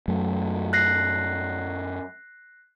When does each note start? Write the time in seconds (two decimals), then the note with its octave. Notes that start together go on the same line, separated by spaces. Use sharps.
0.08 F#2 F#3 A3
0.73 F#6 A#6 C7